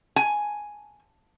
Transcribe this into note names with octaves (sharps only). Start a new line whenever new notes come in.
G#5